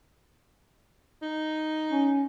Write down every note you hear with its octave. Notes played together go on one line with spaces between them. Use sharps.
D#4
C#4